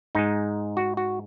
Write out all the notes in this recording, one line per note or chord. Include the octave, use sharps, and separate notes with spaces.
G#2 G#3 D#4
F#4
F#4